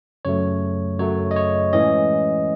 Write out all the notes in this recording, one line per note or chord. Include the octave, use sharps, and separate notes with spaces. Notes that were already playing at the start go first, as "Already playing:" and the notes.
F#2 C#3 F#3 A3 C#5
F#2 C#3 F#3 A3 C#5
D#5
C#5
A2 E3 G#3 C#4 D#5